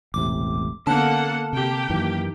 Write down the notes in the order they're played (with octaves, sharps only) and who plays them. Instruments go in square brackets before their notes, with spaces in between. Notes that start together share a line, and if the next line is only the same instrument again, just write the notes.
[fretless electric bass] E1 A1 C3 [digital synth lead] D6
[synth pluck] D3 B3 [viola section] A#3 A4 F#5 [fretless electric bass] C#4 [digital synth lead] A5
[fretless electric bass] C3 [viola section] A#3 G4 G5
[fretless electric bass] F#2 D#3 E3